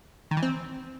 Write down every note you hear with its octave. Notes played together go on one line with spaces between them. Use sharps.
D#3
E3
C4